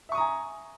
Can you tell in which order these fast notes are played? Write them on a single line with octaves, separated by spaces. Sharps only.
E5 C#6 D#6 A#5 G#5